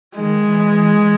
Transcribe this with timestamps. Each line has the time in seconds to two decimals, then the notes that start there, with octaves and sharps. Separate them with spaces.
0.16 D#3 G#3
0.45 E3
0.73 E3